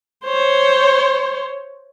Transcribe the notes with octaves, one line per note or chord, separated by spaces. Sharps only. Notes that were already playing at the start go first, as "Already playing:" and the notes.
C5 C#5